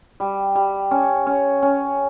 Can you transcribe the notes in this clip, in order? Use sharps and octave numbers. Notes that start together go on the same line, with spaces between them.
G3
G3
C#4
C#4
C#4